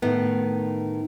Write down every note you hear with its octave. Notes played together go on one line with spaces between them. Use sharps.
A2 D#3 A3 B3